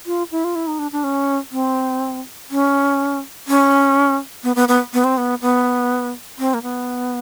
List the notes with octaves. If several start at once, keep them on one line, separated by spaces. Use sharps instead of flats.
F4
E4
F4
E4
D#4
D4
D4
C#4
C4
C#4
C#4
B3
B3
B3
B3
C4
B3
B3
C4
A#3
B3